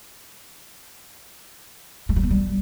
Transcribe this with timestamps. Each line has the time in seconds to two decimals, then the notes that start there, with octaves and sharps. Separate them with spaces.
2.09 G#3
2.16 G3
2.23 B3
2.30 G3